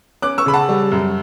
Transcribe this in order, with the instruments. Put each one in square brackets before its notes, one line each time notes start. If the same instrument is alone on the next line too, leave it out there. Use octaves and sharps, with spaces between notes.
[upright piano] C#4 D6 F#6
C#6 E6
C#3 B5
F#5 A5
G3
F#2